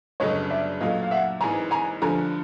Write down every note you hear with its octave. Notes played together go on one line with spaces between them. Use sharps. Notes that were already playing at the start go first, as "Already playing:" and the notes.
G1 F#2 C#3 F#3 A3 C#5 D#5
D5 E5
A#2 F#3 A3 D#5 F5
F5
E5 F#5
G#1 G#2 E3 G#5 A#5
G#5 A#5
G2 D3 F3 A3 G#5 A#5